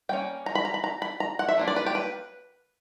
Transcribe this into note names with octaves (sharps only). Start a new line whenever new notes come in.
G3 A#3 C#4 G5
A#5
B5
A#5
B5
A#5
B5
A#5
F#5
E5
F#3 A#3 D4
D5
B4
G4
B4